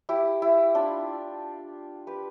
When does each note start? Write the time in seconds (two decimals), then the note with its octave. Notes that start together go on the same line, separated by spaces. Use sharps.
0.09 E4 G4
0.42 E4
0.75 D4 F4
2.07 G4 B4